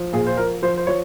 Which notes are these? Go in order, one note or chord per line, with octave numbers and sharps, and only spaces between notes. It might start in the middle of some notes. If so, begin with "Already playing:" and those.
Already playing: F3
A#2 G#4
C5
F3 A#4
F3 C5
C5
F3 C#5